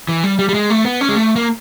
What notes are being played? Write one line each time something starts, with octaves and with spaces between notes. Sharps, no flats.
E3
G3
G3
G3
G#3
A3
B3
C#4
G#3
A3
A#3